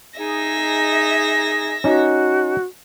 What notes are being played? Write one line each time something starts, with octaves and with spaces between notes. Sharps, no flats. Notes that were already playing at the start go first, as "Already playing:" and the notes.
D#4 G#4 E5 A#6
C#4 D#4 F#4